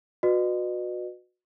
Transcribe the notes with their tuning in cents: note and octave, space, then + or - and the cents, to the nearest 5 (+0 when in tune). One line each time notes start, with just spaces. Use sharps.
F#4 -25 B4 +0 D#5 -40